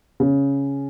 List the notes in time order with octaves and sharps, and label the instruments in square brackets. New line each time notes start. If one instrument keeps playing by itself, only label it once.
[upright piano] C#3